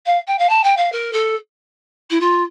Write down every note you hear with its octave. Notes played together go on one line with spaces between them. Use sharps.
F5
G5
F5
A5
G5
F5
A#4
A4
E4
F4